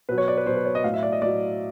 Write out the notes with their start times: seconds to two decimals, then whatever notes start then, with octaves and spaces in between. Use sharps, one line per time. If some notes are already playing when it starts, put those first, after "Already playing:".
0.09 B2 F#3 B4
0.18 C#5
0.28 D5
0.37 B4
0.46 B2 F#3 C5
0.56 B4
0.65 C#5
0.75 D#5
0.84 A2 F#3 F5
0.94 E5
1.03 D5
1.12 D#5
1.22 A2 F#3 D5